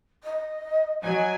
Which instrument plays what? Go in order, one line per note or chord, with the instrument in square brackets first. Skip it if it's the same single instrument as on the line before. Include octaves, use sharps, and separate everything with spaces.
[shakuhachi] D#5
[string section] F#3 G#5 [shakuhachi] D#5